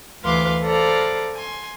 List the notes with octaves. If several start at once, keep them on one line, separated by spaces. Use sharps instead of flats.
D2 E3 B4 F5 C6 D6
A4 C5 D5 F5 A#5 B5
G#5 C6